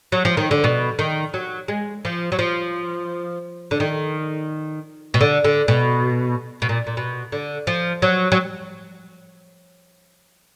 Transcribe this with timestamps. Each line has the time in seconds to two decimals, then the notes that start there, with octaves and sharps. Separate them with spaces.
0.12 F#3
0.25 F3
0.37 D#3
0.51 D3
0.64 B2
0.99 D#3
1.34 F#3
1.68 G#3
2.05 F3
2.32 F#3
2.39 F3
3.71 D3
3.80 D#3
5.14 B2
5.21 D3
5.45 D3
5.68 B2
6.62 B2
6.69 A#2
6.87 A#2
6.97 B2
7.32 D3
7.67 F3
8.02 F#3
8.32 F#3